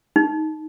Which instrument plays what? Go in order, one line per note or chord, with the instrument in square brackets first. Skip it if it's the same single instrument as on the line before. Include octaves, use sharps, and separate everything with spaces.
[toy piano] D#4